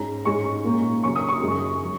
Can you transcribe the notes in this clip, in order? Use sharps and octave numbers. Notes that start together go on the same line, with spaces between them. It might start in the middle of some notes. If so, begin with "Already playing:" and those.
Already playing: G#2 G#3 C#4 A#5
G#2 G#3 C#4 C#6
A#2 A#3 C#4
C#3 F#3 A#3 C#4 C#6
D#6
C#6
F#2 C#3 G#3
F#3